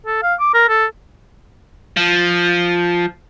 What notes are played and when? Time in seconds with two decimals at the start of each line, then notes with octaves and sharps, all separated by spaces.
0.06 A4
0.23 F5
0.40 D6
0.54 A#4
0.69 A4
1.97 F3